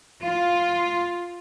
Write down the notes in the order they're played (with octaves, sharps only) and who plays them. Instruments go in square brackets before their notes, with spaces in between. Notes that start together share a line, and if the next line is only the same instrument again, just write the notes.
[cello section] F4